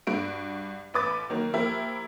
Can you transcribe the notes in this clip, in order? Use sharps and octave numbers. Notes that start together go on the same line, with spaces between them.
G2 F#4 D7
A1 B4 D6 A6
D#3 F#3 A#3
F3 A#3 E4 G4 A#4